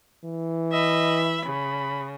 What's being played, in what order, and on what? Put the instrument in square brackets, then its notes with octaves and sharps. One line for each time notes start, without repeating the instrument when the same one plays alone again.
[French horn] E3
[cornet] D#5 [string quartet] E5 B5
[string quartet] C#3 [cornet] B5